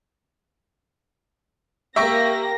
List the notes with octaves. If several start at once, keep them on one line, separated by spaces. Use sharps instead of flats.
A#3 G4 E5 G5 C#6 A#6